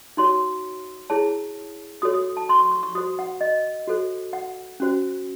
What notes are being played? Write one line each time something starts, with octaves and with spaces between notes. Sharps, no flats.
D#4 F#4 C#5 C6
E4 G#4 C#5 A5
F#4 A4 C#5 D#6
D#6
A5
C6
C#6
C#6
C#6
F#4 C5 D#6
F#5
D#5
F#4 A4 C5
F#5
C#4 F#4 C5